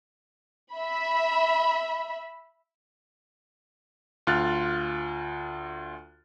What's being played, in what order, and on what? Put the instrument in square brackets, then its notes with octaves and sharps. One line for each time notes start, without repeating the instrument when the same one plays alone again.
[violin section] E5 B5
[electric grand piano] D2 F4 F6 F#6 A6